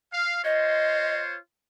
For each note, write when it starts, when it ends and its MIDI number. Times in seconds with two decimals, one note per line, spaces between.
0.13 0.39 77
0.44 1.36 65
0.44 1.36 72
0.44 1.36 73
0.44 1.19 75